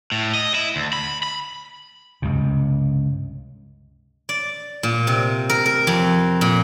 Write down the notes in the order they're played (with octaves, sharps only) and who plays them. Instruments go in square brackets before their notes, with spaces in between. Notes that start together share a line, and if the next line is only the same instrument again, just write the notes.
[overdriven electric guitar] A2
D#5
E4
D2
B5
B5
[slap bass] C#2 G2 C3
[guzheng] D5
A#2
C3
A#4
A#4
F2
A#2